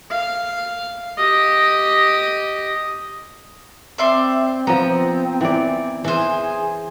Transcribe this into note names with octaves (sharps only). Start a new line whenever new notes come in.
F5
G4 D#5
C4 D5 E5 C6
F3 B3 C4 A#5
E3 D5
E3 G#4 C5 G#5